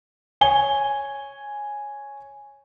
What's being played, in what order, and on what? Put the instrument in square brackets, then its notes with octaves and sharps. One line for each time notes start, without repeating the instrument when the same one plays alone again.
[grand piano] C#5 G#5 G7